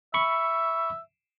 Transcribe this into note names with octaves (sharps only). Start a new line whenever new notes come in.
E5 B5 C#6